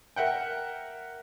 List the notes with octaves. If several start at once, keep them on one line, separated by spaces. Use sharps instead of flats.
A#4 E5 F#5 G5